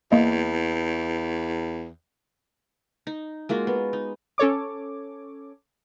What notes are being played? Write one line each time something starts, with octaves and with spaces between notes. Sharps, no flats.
E2 A#3 D#5
D#4
G#3 A#3 F4 F#4
B3
D#4
C#4 A4 C#5 D6